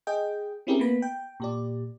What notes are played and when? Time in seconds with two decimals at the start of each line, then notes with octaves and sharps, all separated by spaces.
0.07 G#4 D#5 G5
0.67 C4 C#4 E4 G4 G#4 A#4
0.80 A#3 B3 B5
1.02 G5
1.40 A#2 G4 D5